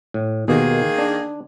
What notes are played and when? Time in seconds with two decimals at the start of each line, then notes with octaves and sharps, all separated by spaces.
0.14 A2
0.48 D#2 B2 D#3 A#3 G#4
0.98 D4